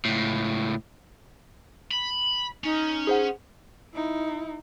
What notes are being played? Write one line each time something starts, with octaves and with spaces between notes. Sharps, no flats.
C#2 A2
B5
C#4 D#4
G#4 C5 F#5
D#4 E4